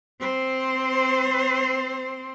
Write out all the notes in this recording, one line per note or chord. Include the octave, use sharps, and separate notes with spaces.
C4 C5